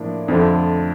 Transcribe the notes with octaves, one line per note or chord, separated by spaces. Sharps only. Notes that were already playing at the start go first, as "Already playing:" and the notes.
Already playing: A2 F3 A#3 D4
F2 D3 F3 A3